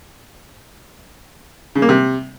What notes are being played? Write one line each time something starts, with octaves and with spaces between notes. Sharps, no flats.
C#3
A#3
C3